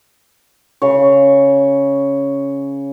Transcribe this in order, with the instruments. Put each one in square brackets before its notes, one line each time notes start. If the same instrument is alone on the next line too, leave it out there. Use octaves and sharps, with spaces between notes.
[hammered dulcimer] C#3 C#5